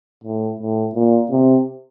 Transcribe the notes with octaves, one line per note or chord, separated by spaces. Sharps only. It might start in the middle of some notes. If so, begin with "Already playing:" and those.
A2
A2
A#2
C3